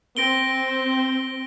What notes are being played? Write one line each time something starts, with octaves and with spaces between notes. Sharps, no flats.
C4 A#6 D7 G7